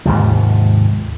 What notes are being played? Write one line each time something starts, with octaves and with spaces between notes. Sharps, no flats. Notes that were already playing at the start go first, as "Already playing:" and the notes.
D#2 G#2 C3 F3